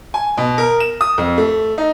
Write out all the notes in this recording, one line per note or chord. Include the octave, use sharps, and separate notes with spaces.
G#5
B2
A#4
E7
D#6
F2
A3
D#4